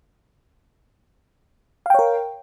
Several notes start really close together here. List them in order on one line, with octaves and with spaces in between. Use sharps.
F5 G5 C#5 A#4